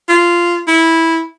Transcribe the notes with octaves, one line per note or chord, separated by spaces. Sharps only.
F4
E4